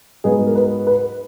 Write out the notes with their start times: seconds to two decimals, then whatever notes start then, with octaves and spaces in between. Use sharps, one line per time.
0.24 G#2 F#3 B3 D#4 G#4
0.47 A#4
0.55 B4
0.87 B4